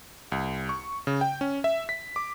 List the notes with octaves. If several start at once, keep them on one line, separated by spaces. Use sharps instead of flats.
C2
C#6
C#3
G5
C#4
E5
B6
D6